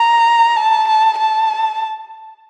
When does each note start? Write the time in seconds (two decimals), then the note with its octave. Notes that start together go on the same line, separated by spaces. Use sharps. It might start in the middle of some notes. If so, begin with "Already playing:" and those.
Already playing: A#5
0.57 A5
0.88 A5
1.18 A5